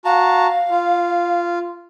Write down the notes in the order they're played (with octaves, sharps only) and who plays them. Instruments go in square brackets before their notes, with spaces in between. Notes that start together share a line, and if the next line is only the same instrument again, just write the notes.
[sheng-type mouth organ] F#4 A5 A#5 [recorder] F5
[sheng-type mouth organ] F4